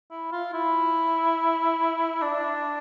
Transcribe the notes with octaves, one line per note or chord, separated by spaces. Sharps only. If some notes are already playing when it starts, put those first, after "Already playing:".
E4
F4
E4
D4